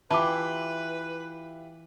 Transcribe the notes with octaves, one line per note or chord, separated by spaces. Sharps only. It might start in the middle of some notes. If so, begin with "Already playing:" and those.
E3 E4 F4 G4 B4 A5 D6